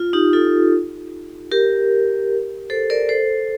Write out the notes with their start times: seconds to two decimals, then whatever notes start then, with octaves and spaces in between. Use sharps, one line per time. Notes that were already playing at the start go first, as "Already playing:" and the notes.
Already playing: F4
0.13 D#4 G4
0.33 F4 A4
1.51 G4 A#4
2.70 A4 C5
2.90 A#4 D5
3.09 A4 C5